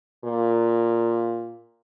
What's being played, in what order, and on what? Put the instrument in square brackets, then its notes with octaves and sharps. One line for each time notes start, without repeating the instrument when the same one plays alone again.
[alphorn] A#2